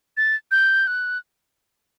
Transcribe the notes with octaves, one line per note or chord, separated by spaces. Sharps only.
A6
G6
F#6